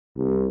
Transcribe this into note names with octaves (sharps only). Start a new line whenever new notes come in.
C2